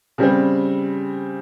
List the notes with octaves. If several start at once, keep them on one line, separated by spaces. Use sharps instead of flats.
C#3 G3 C4